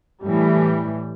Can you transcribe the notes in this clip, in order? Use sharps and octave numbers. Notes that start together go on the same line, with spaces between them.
A2 E3 G3